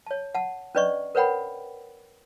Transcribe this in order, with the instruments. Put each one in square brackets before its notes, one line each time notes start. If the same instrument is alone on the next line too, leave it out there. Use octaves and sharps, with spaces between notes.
[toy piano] C#5 A5
F#5 A5
C#4 D4 B4 D5 D#5 C#6
A#4 B4 C#5 F#5 G5 B5